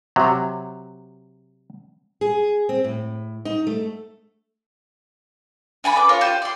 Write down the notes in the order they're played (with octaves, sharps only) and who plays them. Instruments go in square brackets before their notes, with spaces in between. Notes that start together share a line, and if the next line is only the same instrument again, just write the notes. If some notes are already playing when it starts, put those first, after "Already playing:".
[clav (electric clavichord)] C3 F#3
[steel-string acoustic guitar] G#4
C4
A2
D#4
A3
[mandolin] D4 G#5 A5 B5
B4 D6
F4 A#4 C#5
F4 G4 C5
D5 C6